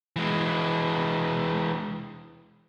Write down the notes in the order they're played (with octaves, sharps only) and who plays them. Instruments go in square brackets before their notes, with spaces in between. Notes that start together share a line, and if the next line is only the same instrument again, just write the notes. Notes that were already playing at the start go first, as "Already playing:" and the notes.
[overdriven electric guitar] E3 G#3